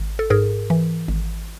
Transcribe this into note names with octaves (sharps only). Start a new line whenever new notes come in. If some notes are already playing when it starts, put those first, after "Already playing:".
Already playing: G#1
A4
G#2 G#4 A#4
E3
G#1